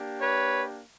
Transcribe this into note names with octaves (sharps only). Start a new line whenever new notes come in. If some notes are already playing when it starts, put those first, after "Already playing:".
Already playing: A#3 D4 G4
B4 C#5